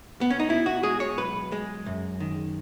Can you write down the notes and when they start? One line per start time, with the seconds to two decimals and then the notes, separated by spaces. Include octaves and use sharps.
0.21 B3
0.30 C#4
0.40 D#4
0.49 B2 E4
0.66 F#4
0.83 G#3 G#4
1.00 C#5
1.17 B1 B4
1.52 G#3
1.86 F#2
2.20 D#3